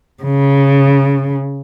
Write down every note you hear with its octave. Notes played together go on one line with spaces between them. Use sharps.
C#3